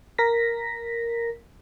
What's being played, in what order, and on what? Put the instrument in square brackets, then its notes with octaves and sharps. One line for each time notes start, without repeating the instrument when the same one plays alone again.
[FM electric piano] A#4 A#6 B6